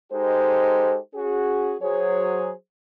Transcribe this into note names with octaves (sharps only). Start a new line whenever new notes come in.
G#3 D#4 G4 A4 C5
C#4 F#4 G#4
F#3 G#4 C5 C#5